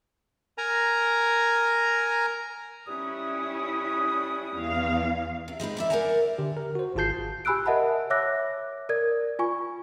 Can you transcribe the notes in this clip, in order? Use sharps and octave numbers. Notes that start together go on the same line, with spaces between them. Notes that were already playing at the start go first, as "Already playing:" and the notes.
A#4 G#5 A#5
G3 C#4 E4 B4 D#6
E2 F5
C3
G#3 C4 D#4 B4
A#3 D5 E5
A#4 C5 D5 F#5 G#5 A#5
D3 G4
A#4
F#4 C5
G#1 F4 G#4 A5 G6 C7
G4 G#5 B5 E6 F#6 D7
A#4 D#5 E5 F#5 A5 B5
C#5 E5 D6 E6 F#6 A#6
A#4 D5 G#6
F4 G#5 C#6